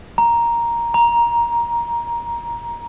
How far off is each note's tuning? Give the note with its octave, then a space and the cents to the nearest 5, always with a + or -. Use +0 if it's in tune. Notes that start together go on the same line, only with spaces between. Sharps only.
A#5 +5
A#5 +15